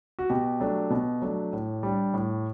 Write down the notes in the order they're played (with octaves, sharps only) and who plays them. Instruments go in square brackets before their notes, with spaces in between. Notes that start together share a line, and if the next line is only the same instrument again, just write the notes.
[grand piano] F#4
B2 G4
F#3 A3 D4
B2
F#3 A3 D4
A2
G3 D4
A2